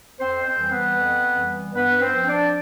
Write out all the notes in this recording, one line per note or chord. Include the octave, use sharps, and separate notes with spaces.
F2 C4 C5
C4 C5
E3 G3
B3 B4
F2
E3 G3
G2 B3 B4
C4 C5
F3
D4 D5